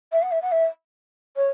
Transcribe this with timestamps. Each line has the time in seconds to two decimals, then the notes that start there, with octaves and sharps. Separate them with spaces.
0.12 E5
0.22 F#5
0.31 E5
0.42 F#5
0.51 E5
1.36 C#5